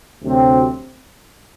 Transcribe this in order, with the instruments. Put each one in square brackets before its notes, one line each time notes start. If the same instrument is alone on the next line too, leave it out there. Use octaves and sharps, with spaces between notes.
[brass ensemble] D2 C3 F#3 C4 G4